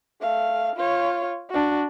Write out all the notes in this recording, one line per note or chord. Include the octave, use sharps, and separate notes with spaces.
A3 F5
F4 C#5
D4 F#4